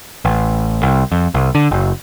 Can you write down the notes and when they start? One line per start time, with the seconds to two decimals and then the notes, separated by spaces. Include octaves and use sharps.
0.25 A1
0.83 C2
1.12 F2
1.34 C2
1.55 D3
1.71 F#1